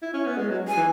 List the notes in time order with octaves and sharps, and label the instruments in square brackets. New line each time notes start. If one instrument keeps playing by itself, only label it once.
[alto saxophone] E4
C#4
B3
G#3
F#3
[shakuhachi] G#5
[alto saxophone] E3